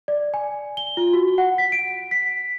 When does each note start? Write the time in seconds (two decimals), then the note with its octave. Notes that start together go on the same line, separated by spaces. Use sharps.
0.08 D5
0.34 G#5
0.77 G7
0.97 F4
1.13 F#4
1.38 F#5
1.58 B6
1.72 D7
2.11 B6